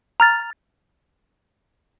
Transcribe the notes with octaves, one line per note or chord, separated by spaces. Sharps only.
A#5 F6 A6